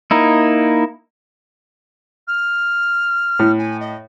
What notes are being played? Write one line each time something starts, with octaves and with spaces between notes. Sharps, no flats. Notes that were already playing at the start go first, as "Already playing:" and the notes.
A#3 D#4 E4
F6
A2
G#5
D#5